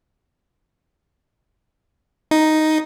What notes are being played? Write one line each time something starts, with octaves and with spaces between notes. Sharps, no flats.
D#4